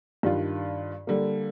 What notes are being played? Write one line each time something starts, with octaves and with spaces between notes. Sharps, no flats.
G2 D#3 G3 D4 F4
D3 G3 A#3